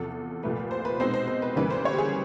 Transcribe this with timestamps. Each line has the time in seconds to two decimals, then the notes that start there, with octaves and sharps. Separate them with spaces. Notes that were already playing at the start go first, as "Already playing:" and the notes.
Already playing: E2 C3 F3 A4
0.43 C2 A#2 F3 A3 B4
0.71 C5
0.85 B4
1.00 B2 G#3 C4 D#4 C5
1.14 C5
1.28 C5
1.42 B4
1.56 D2 C#3 E3 G3 A#3 B4
1.70 C5
1.85 C#5
1.93 G4
1.98 G#4